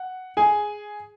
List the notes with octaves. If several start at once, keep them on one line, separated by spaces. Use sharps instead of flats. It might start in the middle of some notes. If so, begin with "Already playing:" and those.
Already playing: F#5
G#4 G#5